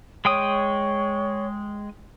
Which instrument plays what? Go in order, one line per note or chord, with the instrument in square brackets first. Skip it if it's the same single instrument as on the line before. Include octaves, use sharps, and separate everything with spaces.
[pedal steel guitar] G#3 G5 D#6 [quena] C#5